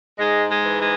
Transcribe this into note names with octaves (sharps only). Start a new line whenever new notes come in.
G#2 G#3
G#3
E3
G#3